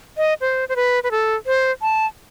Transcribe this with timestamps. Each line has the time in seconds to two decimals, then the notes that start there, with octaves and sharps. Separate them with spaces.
0.17 D#5
0.41 C5
0.69 C5
0.76 B4
1.03 B4
1.11 A4
1.47 C5
1.82 A5